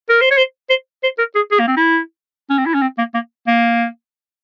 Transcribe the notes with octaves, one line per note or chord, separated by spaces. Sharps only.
A#4
C5
C#5
C5
C5
C5
A#4
G#4
G#4
A#3
C4
E4
C#4
C4
E4
C#4
C4
A#3
A#3
A#3